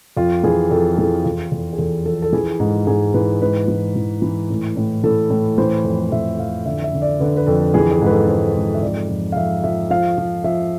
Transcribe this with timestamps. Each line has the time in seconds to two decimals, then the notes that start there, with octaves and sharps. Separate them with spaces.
0.17 F2 F4
0.44 E3 G#4
0.70 F2 A4
0.98 E3 G#4
1.24 E2 F4
1.52 E2
1.73 G#4
1.78 E2 A4
2.06 F3 A4
2.22 A4
2.33 E3 G#4
2.60 G#2
2.87 G#2 G#4
3.14 E3 B4
3.42 G#2 B4
3.68 E3
3.96 E3
4.22 E3
4.50 A2
4.76 A2
5.04 E3 A4
5.30 A2
5.58 E3 C5
5.84 F2
6.12 E3 E5
6.38 F2 F5
6.66 D3 E5
6.84 E5
6.94 D3
7.02 D5
7.20 D3 B4
7.37 B4
7.46 F2 A4
7.74 E3 G#4
7.92 G#4
8.01 G#2 B4
8.11 A4
8.28 G#2 C5
8.56 G#2
8.74 E5
8.82 F2 D5
9.09 F2
9.32 F5
9.36 F2 E5
9.64 F3 E5
9.90 F3 F5
10.18 F3
10.44 F3 E5